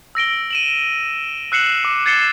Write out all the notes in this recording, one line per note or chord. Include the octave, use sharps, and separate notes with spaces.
E6 A#6 D7 G7
D#7 E7 F#7
E6 F#6 C7 C#7 E7 F#7
D6
G#6 A6 C7 C#7 E7 G7